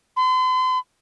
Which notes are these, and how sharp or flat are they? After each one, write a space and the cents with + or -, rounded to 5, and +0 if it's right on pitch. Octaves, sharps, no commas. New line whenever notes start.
C6 -40